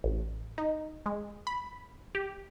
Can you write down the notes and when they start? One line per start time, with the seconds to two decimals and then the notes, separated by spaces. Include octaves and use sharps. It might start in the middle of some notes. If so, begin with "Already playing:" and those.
0.04 A1
0.58 D#4
1.06 G#3
1.47 B5
2.15 G4